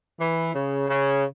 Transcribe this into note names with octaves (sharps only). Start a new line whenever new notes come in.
E3
C#3
C#3